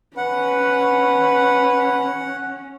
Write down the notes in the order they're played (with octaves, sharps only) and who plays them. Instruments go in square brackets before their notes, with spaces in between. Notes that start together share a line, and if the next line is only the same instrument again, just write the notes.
[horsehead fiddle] C#4 [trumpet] B4 [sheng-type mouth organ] F#5